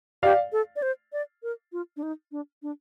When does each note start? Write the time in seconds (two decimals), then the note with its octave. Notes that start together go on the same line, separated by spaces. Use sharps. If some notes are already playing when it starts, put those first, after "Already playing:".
0.23 G4 D5 F5
0.52 A4
0.76 D5
0.82 C5
1.13 D5
1.43 A#4
1.73 F4
1.97 D4
2.03 D#4
2.32 D4
2.63 D4